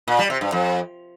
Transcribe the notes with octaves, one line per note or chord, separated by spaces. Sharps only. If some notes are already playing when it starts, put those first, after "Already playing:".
A#2
G3
C3
G2
F2